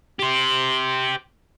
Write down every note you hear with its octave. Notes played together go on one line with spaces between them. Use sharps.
G4 C5